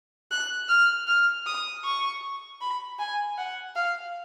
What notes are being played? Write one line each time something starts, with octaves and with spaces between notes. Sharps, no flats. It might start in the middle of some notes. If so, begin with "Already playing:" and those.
F#6
F6
F6
D#6
C#6
B5
G#5
F#5
F5